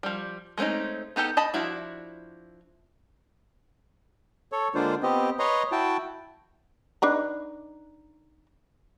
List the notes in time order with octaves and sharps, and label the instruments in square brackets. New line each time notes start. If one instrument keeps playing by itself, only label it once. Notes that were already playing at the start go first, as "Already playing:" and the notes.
[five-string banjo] F3 G3
G#3 A3 C4 C#4 D#4
B3 D#4 G4 A4
D#5 A5 B5
F3 D4 E4 F#4
[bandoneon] A4 C#5
D3 G#3 A#3 D4 F4 C5
B3 C4 G4 D#5
B4 C#5 D#5 A#5 C6
E4 F#4 G5 A5
[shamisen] D4 D#4 B4